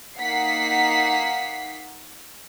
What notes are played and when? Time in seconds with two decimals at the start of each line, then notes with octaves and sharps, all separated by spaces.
0.18 A#3 D#4 F#5 B6 C7